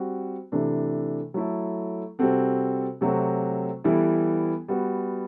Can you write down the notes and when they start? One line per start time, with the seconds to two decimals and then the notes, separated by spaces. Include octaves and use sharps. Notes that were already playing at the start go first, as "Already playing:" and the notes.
Already playing: G3 C4 F#4
0.52 C3 E3 A3 D4 A4
1.34 F#3 A3 E4 A4
2.19 C3 G3 C4 F#4 A4
3.01 C3 F#3 A3 C4 F#4
3.84 E3 G3 B3 E4 A4
4.68 G3 B3 F#4